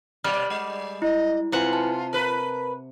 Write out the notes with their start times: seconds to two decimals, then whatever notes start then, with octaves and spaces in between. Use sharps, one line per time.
0.24 B2 G3 D5 F6
0.50 G#3 D#5
1.02 E4 D#5
1.52 C3 E4 F4 B4 F#5 G#5
1.73 A5
2.13 A#4 B4